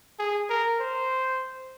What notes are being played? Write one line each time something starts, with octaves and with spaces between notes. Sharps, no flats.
G#4
A#4
C5